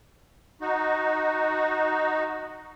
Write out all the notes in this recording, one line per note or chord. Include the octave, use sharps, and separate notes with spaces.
D#4 F#4